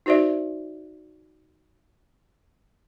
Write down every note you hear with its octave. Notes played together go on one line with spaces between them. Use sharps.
D#4 F#4 C5 D5 E5